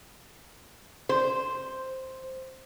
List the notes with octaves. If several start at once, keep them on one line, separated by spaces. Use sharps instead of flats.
C5